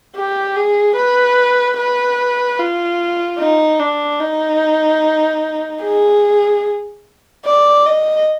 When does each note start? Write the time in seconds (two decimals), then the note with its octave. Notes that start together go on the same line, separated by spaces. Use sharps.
0.15 G4
0.56 G#4
0.96 B4
1.77 B4
2.59 F4
3.39 D#4
3.80 D4
4.20 D#4
5.83 G#4
7.45 D5
7.86 D#5